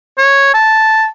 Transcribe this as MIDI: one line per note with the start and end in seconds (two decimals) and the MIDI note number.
0.18 0.53 73
0.54 1.06 81